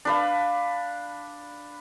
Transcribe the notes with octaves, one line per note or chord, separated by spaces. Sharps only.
D4 B4 F5